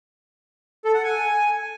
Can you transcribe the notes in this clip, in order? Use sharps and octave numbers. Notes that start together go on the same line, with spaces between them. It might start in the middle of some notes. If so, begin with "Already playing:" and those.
A4
F#5
G#5